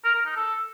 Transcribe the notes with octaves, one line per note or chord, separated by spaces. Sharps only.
A#4
A#4
D#4
A4